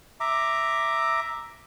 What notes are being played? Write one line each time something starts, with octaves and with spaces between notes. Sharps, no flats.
E5 A#5 D6